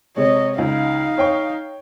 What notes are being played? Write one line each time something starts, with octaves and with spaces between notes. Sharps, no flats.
C3 G#3 C#5 D#5
C#2 D#4 F5
C#5 G5 C#6